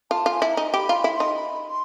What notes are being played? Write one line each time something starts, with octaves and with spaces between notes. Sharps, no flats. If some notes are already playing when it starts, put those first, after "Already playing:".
F4 A5
F4
G#5
E4
A#5
D#4
G4 B5
F4 A#5 B5
E4
D#4 C6
B5
C6